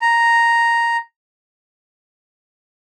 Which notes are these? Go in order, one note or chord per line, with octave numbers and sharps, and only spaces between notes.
A#5